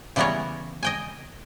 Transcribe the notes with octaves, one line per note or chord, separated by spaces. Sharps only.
C#3 E3 G3 B3 A#4 C#5
D#5 G5 G#5